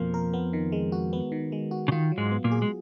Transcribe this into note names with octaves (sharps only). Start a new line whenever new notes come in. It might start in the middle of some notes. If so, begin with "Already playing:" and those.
Already playing: F2 B2 F3 A#3 F4 A#4
A#4
B3
D#3
G#3
F#4
B3
D#3
G#3
F#4
C#3
D#3 F4
F#3
G#2 G#3
B3
A#2 A#3
G#4
G#3